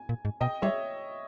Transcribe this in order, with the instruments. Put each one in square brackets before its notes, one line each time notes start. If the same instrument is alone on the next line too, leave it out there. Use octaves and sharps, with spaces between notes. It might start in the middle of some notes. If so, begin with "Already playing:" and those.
Already playing: [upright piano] G#5
[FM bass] A#2
G#2
[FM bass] B2 [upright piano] D#5 G5
[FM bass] G3 [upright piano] C#5 E5